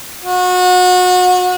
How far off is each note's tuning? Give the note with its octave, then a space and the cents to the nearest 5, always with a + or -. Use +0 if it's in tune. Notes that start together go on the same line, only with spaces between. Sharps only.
F#4 -30